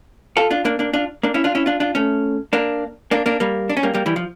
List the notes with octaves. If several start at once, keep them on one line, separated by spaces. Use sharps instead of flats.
F4 A4
D4 F4
A#3 D4
A#3 D4
D4 F4
A#3 D4
C#4 E4
D4 F4
C#4 E4
D4 F4
D4 F4
A3 C#4
A#3 D4
A#3 D4
A#3 D4
G3 A#3
D4
C#4
G3 A#3
G3 A#3
E3 G3
F3